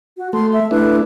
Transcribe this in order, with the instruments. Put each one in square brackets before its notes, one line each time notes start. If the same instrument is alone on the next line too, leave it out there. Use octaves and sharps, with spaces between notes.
[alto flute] F#4
[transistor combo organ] A3 [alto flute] C6
[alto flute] E5
[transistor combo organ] A3 D4 E4 [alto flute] B4